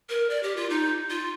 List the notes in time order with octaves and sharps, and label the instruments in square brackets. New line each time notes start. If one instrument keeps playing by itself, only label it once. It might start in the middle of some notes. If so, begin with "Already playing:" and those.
[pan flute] A#4
D5
G4
F4
D#4
F4